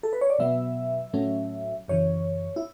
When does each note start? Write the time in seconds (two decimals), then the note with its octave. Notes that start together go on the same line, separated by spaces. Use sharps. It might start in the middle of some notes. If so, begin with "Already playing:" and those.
0.03 A4
0.13 B4
0.21 C#5
0.30 D5
0.39 B2 F#3 B3 E5
1.13 A2 F#3 A3 C#4
1.88 F#2 C#3 E3 C#5
2.56 E4